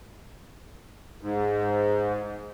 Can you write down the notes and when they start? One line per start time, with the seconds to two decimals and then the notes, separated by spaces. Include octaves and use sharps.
1.21 G#2